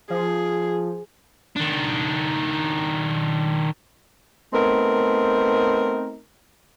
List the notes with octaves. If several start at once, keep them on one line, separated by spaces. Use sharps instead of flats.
F3 G#4
D#3 D4
A3 B3 C4 D#4 A#4